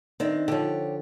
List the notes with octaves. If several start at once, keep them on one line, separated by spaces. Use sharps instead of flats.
D#3 C4 D4 E5
D3 F3 G4 C#5